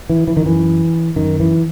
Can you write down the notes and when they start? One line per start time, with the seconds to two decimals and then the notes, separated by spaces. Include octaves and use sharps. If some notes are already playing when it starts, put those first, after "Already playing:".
0.10 E3
0.28 E3
0.37 D#3
0.45 F#2 E3
1.16 F#2 D#3
1.40 E3